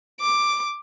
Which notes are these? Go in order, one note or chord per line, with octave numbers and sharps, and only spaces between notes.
D6